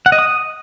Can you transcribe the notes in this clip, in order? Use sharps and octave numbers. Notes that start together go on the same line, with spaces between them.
F#5
D#5
D#6